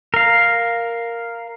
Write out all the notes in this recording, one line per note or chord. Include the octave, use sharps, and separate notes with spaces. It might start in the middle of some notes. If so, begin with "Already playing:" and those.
A#4 F5